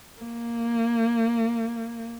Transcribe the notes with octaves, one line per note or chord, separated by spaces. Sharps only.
A#3